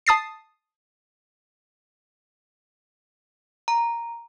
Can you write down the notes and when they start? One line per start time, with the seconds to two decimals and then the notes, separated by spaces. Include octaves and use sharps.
0.06 A5 D#6 A6 C7
3.68 A#5